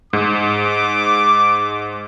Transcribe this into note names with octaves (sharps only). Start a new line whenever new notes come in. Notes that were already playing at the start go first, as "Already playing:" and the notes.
G#2 D6